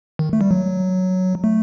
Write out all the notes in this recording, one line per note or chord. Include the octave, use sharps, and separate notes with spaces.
D#3
A3
G3
F#3
A3